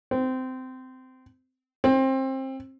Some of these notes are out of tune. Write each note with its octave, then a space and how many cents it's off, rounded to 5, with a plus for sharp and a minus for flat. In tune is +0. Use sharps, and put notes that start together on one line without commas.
C4 -20
C4 +25